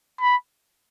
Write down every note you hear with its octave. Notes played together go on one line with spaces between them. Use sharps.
B5